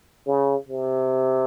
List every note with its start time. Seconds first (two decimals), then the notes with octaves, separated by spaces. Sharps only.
0.27 C#3
0.69 C3